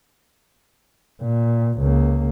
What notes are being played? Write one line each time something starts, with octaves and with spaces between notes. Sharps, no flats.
A#2
C#2 A#3